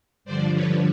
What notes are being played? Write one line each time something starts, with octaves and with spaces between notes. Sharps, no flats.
G2 D3 F3 C5 D5
B4 C#5